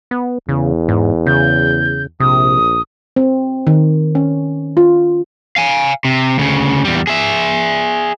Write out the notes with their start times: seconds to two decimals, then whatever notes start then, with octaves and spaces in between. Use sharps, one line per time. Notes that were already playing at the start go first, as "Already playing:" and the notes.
0.11 B3
0.49 E2 C#3
0.88 G#2
1.27 C#3 G6
2.20 A#1 C3 D#6
3.16 C4
3.67 D#3
4.15 C#4
4.77 F4
5.56 F5 G#5
6.05 C3
6.38 D2 C#3
6.85 E2 G3
7.07 G#4 E5